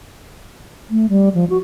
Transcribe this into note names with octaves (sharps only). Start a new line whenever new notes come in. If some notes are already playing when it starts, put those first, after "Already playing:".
A3
G3
F3
F#4